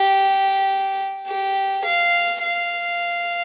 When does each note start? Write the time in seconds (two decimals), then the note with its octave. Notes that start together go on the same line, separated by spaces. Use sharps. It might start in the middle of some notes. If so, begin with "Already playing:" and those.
Already playing: G4
1.27 G4
1.85 F5
2.43 F5